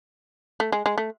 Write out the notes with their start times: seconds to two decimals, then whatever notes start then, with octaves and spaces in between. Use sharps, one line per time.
0.60 A3
0.72 G#3
0.86 G#3
0.98 A3